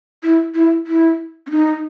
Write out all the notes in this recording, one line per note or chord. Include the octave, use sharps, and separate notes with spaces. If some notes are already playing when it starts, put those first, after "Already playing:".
E4
E4
E4
C#4
D#4